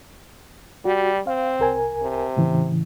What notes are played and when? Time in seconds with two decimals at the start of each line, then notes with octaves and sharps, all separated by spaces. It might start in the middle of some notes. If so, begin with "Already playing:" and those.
0.85 G3 F#4
1.27 C4 F5
1.59 C2 A#4 G#5
2.02 C3
2.37 A2 C#3 E3